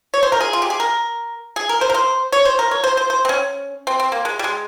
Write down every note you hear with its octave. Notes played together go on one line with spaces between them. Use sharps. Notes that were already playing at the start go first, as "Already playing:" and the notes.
C#5
C5
A#4
G#4
F4
G4
G#4
A#4
G#4
A#4
C5
A#4
C5
C#5
C5
A#4
C#5
C5
C5
C5
C4
C#4
C4
C4
A#3
G#3
G3
G#3